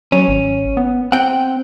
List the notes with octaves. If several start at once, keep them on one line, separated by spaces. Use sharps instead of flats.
F#3 C#4
G#1
B3
C4 F#5 G5